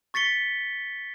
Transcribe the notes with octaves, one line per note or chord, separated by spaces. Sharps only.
C#6 A6 B6 C#7 G7